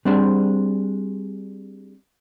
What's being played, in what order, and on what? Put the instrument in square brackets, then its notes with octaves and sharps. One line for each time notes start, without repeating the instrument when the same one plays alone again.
[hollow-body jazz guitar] G3 C4 D4 G#4 C5